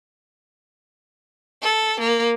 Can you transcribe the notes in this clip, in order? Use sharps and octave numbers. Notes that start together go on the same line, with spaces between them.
A4
A#3